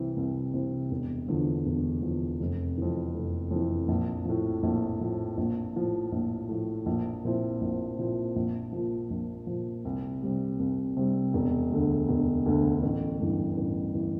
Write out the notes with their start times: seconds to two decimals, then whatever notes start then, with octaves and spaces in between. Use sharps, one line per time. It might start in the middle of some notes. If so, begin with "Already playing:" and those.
Already playing: C2 C3 E3
0.16 C2
0.53 C3 E3
0.91 E1
1.28 E2 D3 F3
1.66 E1
2.02 E2 D3 F3
2.40 F1
2.77 F2 E3
3.14 F1
3.51 F2
3.56 E3
3.88 A#1
4.25 A2 F3
4.63 A#1
5.00 A2 F3
5.37 A#1
5.75 A2 F3
6.12 A#1
6.49 A2 F3
6.86 A#1
7.24 A#2 F3 C4 E4
7.61 A#1
7.98 A#2 F3 C4 E4
8.36 A#1
8.72 A#2 F3
9.10 A#1
9.47 A#2 F3
9.85 C2
10.22 C3 G3
10.59 C2
10.97 C3 G3
11.34 E1
11.71 D2 D3
12.09 E1
12.46 D2 D3
12.82 A1
13.20 G2 E3
13.57 A1
13.95 E3